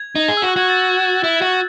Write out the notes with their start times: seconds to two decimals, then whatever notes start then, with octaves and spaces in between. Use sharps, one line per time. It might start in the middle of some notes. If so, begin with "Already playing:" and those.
Already playing: G#6
0.16 D#4
0.29 G#4
0.37 E6
0.42 F#4
0.48 F#6
0.56 F#4 G#6
0.69 A6
1.24 E4
1.42 F#4